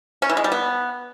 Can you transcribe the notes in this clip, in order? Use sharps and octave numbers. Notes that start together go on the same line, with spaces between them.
C#4
E3
G#3
G3
B3